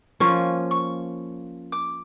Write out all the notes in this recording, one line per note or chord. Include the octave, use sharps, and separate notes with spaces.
F3 A#3 C#4 C#6
C#6
D6